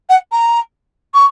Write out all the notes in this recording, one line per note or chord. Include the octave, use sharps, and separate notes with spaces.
F#5
A#5
C#6